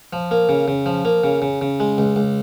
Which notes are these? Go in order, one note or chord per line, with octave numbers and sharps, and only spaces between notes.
F3
A#3
C#3
C#3
F3
A#3
C#3
C#3
C#3
G#3
C#2
C#2